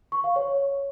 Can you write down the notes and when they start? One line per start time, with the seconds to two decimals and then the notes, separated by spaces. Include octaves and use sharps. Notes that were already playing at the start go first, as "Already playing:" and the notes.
0.12 C#6
0.24 F5
0.36 C#5